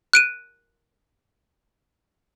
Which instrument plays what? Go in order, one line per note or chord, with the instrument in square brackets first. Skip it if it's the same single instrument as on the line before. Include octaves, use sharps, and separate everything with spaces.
[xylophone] F#6 D7 D#7